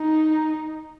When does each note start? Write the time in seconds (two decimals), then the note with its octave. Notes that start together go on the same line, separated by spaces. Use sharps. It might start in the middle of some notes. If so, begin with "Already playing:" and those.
Already playing: D#4